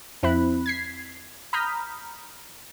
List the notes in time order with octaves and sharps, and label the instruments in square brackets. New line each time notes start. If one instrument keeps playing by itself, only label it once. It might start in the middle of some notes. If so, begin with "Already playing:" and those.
[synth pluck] F2 C4 E4 B5 F#6
G#6 B6 C7
A#5 B5 D#6 F6 G6 B6